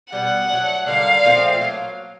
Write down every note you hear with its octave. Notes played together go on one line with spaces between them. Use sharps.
B2 G3 B3 F#5
F#3 A3 D4
D3 G3 A#3 D#4 F5
A#2 F3 A3 C4
F#3 A#3